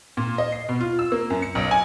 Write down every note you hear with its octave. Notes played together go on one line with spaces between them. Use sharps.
A#2
D#5
C7
B2
F4
E6
A#3
F#2
C#7
B1
G#5